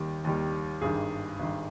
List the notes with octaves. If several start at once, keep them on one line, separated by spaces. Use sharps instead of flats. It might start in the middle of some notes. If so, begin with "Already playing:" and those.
Already playing: D#2 D#3 G3 G4
D#2 D#3 G3
G#1 G2 D#3 G#4
G#1 G2 D#3